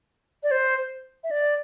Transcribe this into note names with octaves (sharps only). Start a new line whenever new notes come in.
D5
C5
E5
D5